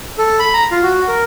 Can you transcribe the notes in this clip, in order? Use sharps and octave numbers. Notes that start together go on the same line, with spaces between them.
A4
B5
A#5
F4
F#4
A#4